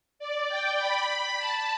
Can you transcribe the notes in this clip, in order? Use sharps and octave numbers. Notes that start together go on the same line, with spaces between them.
D5
G5
B5
A5